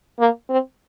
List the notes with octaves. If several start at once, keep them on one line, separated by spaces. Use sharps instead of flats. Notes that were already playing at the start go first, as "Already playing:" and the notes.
A#3
C4